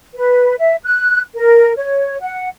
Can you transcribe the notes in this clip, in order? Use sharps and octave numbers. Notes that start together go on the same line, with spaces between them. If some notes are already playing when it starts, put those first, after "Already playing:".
B4
E5
F#6
A#4
C#5
F#5